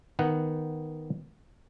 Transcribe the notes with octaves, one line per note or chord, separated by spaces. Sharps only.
D#3 B3 F#5